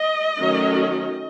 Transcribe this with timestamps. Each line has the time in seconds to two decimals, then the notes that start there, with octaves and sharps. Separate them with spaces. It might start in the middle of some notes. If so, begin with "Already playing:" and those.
Already playing: D#5
0.39 D#3 F#3 A3 C#4